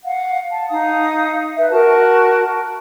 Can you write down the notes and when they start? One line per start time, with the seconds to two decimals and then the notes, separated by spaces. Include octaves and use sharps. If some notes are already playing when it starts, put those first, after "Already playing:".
0.05 F5 F#5
0.51 A5
0.69 D#4 F5 D#6
1.57 B4 D#5 E5
1.70 F#4 A#4 A5